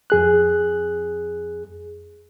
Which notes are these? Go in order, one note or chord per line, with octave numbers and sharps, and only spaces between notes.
F2 G#4 F#6